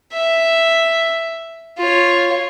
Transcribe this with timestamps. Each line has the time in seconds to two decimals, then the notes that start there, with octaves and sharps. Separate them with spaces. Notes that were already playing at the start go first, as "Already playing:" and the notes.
0.13 E5
1.78 F4 C#5